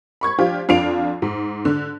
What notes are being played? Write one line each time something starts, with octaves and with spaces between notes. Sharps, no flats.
B5 C#6 G#6
F3 D4 F4 G4
F2 D4 F4 C7 D7 F7
G#2
D3